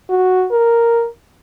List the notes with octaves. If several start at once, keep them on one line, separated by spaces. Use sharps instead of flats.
F#4
A#4